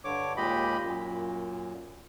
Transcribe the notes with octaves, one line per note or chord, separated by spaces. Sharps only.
G2 D3 C#5 D6
D#2 A#2 G#3 G4 D#5 B5
F#2 A#2